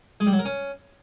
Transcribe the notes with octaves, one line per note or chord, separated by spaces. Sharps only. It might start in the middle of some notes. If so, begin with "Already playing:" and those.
G#3
G3
F#3
A#4
C#4